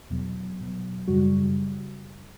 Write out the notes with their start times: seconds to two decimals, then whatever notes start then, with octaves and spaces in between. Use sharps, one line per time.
0.10 E2 B2 F#3
0.59 E2 B2 F#3
1.07 F#2 C#3 G3 F#4